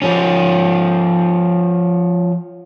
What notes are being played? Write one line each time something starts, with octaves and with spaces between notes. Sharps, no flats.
F3 C#4